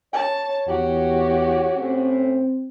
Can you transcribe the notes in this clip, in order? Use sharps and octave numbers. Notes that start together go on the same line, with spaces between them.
C#5 A5
E2 F#4 G4
A2 C4 C#4